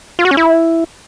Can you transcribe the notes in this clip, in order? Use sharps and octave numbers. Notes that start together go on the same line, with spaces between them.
F4
F#4
C#4
E4